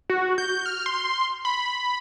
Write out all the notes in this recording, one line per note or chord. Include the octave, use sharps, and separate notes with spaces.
F#4
G6
F6
C6
B5